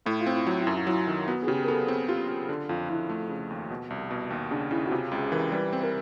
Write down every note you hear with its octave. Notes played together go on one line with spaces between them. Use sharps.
A2 E4
F4
C4
E4
F#3 F4
E4
F#2
F4
F#3 E4
D#3
B3 F#4
G#4
C#3 G4
A#4
B3 A4
C4 G#4
F4 G4
F4
D3
F2 F4
F2 E4
A3
C#3
D#2
B2
C2
B2
D#2
C#3 D4
C#3 E4
F#4
C3 F4
C#2 G#4
E3 A#4
G3 B4
C4
A#4